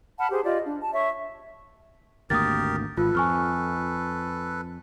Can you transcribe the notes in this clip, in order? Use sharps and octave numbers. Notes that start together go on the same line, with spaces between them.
F#5 A5 B5 F6
G4 G#4 C5
F4 G4 D5 D#5
D4
A5
C#5 E5 C#6
G#1 D2 A#3 G4 A#4 D#6 A6
G#1 F4 A4 B4
F2 G#5 C#6 F6